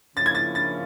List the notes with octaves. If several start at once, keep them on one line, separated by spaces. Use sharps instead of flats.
C#3 F3 A#3 C#4 E4 A6
G#6
A6
A6